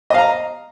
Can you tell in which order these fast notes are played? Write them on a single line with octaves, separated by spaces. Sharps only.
D#5 F5 A#5